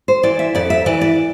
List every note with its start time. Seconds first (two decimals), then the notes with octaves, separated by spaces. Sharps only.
0.08 C5
0.23 E3 D5
0.39 E5
0.55 F2 D5
0.70 E5
0.86 E3 D5
1.01 D5